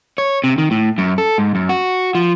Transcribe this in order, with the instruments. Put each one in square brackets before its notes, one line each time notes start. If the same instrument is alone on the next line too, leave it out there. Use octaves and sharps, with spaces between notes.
[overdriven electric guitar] C#5
C3
D#3
A2
F#2
A4
G#2
F#2
F#4
F3